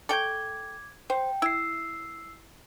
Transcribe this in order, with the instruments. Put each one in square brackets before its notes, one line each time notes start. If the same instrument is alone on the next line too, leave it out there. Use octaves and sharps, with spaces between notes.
[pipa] A4 C#5 G5 [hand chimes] D6 G#6
[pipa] C5 [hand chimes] G5
[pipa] E4 [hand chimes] E6 C7